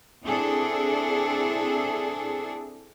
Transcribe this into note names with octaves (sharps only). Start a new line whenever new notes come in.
C4 D4 E4 G#4 A4